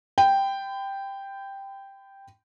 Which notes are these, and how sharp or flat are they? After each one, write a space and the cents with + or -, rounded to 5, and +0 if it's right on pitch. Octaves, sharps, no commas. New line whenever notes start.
G5 +0 B5 +40